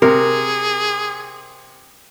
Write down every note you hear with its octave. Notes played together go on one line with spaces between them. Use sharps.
C3 G#4 A#4